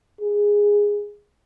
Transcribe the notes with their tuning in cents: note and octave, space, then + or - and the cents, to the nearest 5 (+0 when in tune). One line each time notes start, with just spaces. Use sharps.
G#4 -10